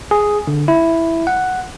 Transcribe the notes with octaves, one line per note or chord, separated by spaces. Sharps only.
G#4
D3
E4
F#5